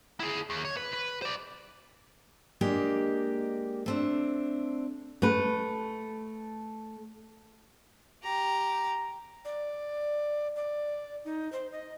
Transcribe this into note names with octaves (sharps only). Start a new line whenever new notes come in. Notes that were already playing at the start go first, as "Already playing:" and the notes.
E4 G#4
D#2
C#5
B4
B4
C5 D5
G#3 A#3 D4 G4 D#5
A3 C4 D4
A3 B4
G4 A#5
D5
D5
D#4
C5
D#5